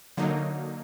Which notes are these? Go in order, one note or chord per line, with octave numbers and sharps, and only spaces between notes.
D3 F#3 A#3 D#4